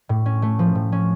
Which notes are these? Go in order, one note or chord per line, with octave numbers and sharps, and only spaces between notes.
A2
C#4
A3
F3
A2
C#4